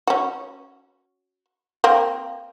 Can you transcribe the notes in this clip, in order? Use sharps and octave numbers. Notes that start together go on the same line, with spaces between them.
C#4 F#4
A#3 C4